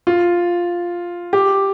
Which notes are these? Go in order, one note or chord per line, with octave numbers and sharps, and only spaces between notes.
F4
G4